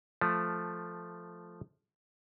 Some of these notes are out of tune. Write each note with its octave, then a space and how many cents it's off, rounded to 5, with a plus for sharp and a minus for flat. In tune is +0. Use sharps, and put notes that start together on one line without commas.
F3 +0 A3 +0